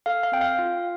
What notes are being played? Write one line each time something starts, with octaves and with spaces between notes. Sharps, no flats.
A4 F5
F5
C4 G5
F5
F4